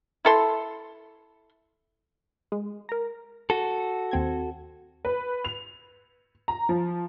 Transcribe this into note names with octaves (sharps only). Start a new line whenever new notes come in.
E4 A4 C6
G#3
A#4 A#5
F#4 A4
D#2 C4 G#6
B4
F7
A#5
F3